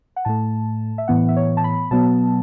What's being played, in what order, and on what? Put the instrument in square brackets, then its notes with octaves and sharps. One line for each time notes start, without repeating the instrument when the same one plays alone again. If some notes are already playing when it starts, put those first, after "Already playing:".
[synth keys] F#5
A2 A3 A5
E5
A2 E3 B3 F#5
E5
C#5
A5
B5
B2 F#3 B3 A5